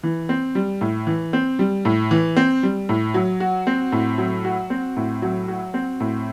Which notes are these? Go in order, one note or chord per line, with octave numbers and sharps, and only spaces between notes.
E3
C4
G3
A2
E3
C4
G3
A2
E3
C4
G3
A2
F#3
F#4
C4
A2
F#3
F#4
C4
A2
F#3
F#4
C4
A2